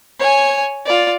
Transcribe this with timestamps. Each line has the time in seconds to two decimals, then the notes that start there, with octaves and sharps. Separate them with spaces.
0.20 C#5 G#5
0.86 F4 D5